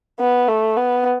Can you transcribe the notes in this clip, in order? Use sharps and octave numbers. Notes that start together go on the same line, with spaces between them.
B3
A3
B3